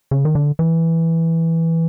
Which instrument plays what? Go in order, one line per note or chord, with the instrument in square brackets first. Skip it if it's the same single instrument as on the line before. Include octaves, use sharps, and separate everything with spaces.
[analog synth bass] C#3
D#3
D3
E3